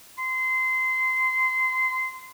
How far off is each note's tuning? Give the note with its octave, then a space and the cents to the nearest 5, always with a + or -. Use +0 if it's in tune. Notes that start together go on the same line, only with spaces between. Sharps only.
C6 -20